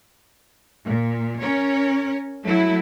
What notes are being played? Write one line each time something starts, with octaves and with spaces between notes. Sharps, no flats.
A#2
C#4 A#4 C#5
F#3 A3 E4